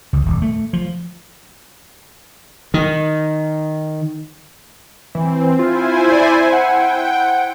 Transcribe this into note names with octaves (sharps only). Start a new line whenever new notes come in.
C#2
D#1
A3
F3
D#3
E3 C4
E4 F4 C5 G#5
D5
F#5 G5